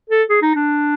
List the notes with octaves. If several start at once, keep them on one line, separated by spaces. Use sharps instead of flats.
A4
G#4
D#4
D4